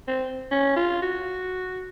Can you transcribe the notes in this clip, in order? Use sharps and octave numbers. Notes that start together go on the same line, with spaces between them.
C4
C#4
F4
F#4